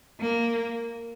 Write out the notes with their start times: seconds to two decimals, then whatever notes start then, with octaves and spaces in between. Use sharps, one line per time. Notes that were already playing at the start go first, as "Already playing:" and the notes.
0.21 A#3